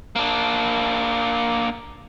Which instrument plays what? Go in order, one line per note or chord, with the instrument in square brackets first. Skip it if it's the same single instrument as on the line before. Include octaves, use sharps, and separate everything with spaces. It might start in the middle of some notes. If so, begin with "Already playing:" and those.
[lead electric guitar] A#3 D4